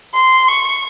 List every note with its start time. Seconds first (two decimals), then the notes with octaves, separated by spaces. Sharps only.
0.14 C6
0.48 C#6